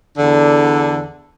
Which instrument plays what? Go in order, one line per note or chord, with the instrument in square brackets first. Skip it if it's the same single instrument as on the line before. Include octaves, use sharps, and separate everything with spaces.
[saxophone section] E2 D3